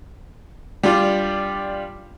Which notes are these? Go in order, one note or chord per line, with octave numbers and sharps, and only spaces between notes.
G3 D4 F4